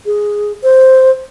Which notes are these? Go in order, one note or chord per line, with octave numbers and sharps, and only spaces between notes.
G#4
C5